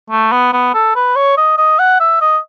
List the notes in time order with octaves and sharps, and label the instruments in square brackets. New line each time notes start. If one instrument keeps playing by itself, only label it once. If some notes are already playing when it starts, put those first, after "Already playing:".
[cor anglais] A3
B3
B3
A4
B4
C#5
D#5
D#5
F#5
E5
D#5